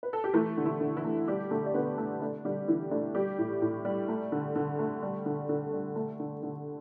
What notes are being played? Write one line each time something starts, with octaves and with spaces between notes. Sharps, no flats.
B4
A4
G4
E3 A3 E4
D3
E3 E4
D3
E3 E4
A3
G3 A3 G4
D3 A3 A4
D5
D3 B3 B4
A3 A4
A3 D4
D3 G3 G4
D3 E3 E4
A3 D4
G3 G4
A2
A2
G3
A3
D3
D3
A3
G3
D3
D3
G3
A3
D3
D3